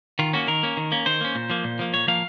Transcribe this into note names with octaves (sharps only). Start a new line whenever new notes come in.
D#3 F4
A#3 C#4 F#4
D#3 A#4
A#3 C#4
D#3
A#3 C#4
D#3 C5
A#3 C#4
A#2
F3 A#3
A#2
F3 A#3
A#2 C#5
F3 A#3 F5